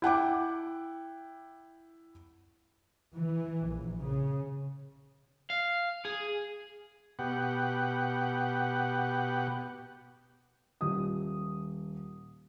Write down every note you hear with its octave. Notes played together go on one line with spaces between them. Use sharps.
E4 F#5 G5 D6
E3
A#1
C#3
F5
G#4
B2 G4 F#5
D#1 D#6